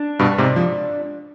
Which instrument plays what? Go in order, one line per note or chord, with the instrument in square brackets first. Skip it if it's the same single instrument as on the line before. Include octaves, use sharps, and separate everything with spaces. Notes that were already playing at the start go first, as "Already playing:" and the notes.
Already playing: [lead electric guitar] D4
[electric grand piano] G2 B2
G#2 C3
F3